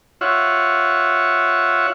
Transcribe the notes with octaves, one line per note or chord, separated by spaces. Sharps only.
F4 C#5 E5 F#5